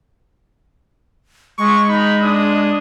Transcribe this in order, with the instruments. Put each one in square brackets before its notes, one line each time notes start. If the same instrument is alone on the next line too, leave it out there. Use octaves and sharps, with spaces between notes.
[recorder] G#3 [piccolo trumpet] C#6
[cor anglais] D#4 [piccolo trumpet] B5
[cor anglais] D4 [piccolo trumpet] D#6